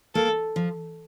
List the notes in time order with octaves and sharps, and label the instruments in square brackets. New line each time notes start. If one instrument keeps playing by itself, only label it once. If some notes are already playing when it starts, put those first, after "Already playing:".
[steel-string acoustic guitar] A#3 [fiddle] A4
[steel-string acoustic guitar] F3